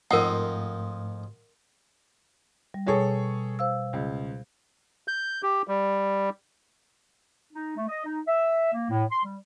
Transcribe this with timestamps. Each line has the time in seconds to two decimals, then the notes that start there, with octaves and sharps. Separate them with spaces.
0.11 F2 G#2 F3 A3 D#4 A#4 F#5
2.74 G3
2.87 B2 G3 G#4 A4 C#5
3.59 C5 F5 E6
3.93 C#2
5.08 G6
5.43 G4
5.68 G3
7.54 D#4
7.77 A3
7.88 D#5
8.06 D#4
8.28 E5
8.73 A#3
8.90 A2
9.11 C6
9.25 G3